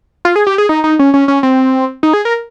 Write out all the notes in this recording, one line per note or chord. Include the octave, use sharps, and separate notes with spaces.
F4
G#4
G4
G#4
D#4
D#4
C#4
C#4
C#4
C4
D#4
G#4
A#4